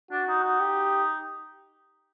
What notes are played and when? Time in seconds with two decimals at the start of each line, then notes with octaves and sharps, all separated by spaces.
0.11 D4 F#4
0.28 D#4
0.44 D#4
0.60 G4